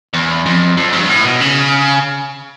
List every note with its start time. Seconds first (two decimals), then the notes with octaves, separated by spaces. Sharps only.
0.14 E2
0.46 F2
0.77 F2
0.93 G2
1.09 A2
1.25 B2
1.40 C#3